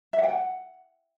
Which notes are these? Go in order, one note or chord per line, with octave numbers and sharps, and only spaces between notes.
E5
F#5
G5
F#5